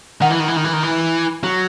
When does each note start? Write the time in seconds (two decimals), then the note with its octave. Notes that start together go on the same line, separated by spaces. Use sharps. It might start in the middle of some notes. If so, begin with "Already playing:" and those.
0.22 D#3 F#5
0.30 E3
0.40 D#3
0.48 E3
0.56 D#3
0.64 E3
0.73 D#3
0.83 E3
1.44 F#3